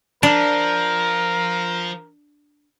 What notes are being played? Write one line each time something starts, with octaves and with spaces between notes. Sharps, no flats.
F3 D4 A#4